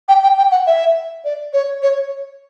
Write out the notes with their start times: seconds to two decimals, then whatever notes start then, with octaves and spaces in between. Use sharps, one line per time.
0.08 G5
0.23 G5
0.38 G5
0.51 F#5
0.67 E5
1.25 D5
1.53 C#5
1.82 C#5